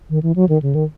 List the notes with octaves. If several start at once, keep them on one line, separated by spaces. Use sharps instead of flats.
D#3
E3
F#3
D#3
C#3
D#3